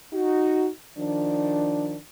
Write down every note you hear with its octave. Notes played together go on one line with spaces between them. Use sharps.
D#4 F#4
D#3 F3 D4